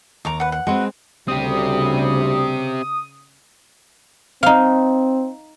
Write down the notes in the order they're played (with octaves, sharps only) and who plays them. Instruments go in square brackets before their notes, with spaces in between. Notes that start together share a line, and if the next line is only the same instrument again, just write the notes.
[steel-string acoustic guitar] D#2 [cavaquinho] A#5 C#6 D6
[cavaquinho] B4 F#5
F#5
[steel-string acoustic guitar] G#3 C4 [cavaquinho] F#4 B4 C6
[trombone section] D2 G3 [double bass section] C#3 [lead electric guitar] C4 G4 [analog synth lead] D#6
[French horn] C4 [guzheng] D#4 F5